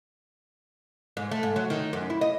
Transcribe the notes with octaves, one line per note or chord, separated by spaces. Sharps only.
G#2
A3
G#2
F#3
D#3
F#2
E4
D#5